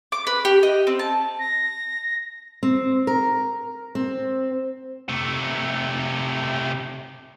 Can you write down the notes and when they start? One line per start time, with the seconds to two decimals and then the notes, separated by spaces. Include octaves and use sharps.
0.12 D6
0.27 B4
0.45 G4
0.63 D#5
0.87 C4
0.99 A5
1.39 A#6
2.63 C4
3.07 A#4
3.95 C4
5.09 C3 A3